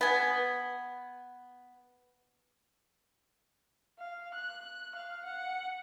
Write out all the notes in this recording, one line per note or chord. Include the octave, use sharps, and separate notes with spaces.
B3 G#5
F5
F#6
F5
F#5